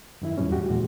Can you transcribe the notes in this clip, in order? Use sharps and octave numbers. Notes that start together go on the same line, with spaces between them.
F#2 D#3 E4
E2 A2 F3 G3 C#4
D#2 F#4 G4
A#2 E3 G#3